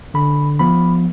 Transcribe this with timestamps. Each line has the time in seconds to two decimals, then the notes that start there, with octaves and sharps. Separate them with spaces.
0.14 D3 B5
0.59 F3 B3 B5